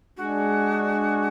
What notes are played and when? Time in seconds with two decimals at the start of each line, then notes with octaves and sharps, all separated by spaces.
0.17 G#3 D4 F#4 G#4